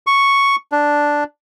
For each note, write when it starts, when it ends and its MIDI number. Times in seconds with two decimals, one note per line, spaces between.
0.07 0.56 85
0.72 1.24 62